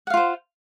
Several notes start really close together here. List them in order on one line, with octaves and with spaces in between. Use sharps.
F#5 F5 F4 C5